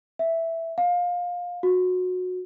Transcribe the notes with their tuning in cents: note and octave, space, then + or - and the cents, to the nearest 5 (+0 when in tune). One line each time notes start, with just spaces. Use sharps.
E5 +0
F5 +20
F#4 -20